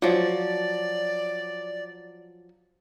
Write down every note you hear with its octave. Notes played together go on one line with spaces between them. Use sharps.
F3 F#3 D5